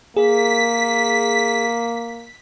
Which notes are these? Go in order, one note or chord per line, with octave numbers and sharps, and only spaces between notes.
A#3 G#4 A#4 B6